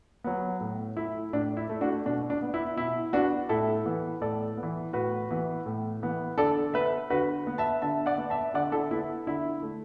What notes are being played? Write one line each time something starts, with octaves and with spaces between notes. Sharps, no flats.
F#3 B3
A2
A3 E4
A2 D4
E4
A3
D4 F#4
B2 D4
D4
B3
E4
B2 E4
B3 D4 F#4
A2 E4 A4
E3 B3
A2 A4 D5
B3
E3
A2 F#4 B4
E3 B3
A2
E3 B3
D3 A4 D5
B3 B4 E5
D3 F#4 B4
B3
E5 A5
D3 E5 A5
D5 F#5
B3
E5 A5
D3 D5 F#5
E4 A4
B3 E4
D3 E4
A3